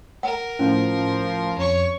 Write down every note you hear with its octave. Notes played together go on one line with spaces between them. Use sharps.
A#4 F#5
A2 F3 C#4
F2 C#5 C#6